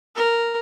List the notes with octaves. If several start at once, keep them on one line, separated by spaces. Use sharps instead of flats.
A#4